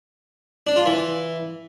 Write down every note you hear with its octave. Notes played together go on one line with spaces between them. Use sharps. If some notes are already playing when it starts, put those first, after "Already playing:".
D4
F4
E3